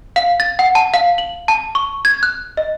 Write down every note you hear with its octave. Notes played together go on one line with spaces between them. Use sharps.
F5
A6
F#5
A5
F5
F#7
A5
C#6
G#6
F#6
D#5